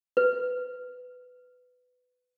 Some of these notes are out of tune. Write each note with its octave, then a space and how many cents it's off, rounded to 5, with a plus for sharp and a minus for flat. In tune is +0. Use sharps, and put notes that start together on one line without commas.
B4 +15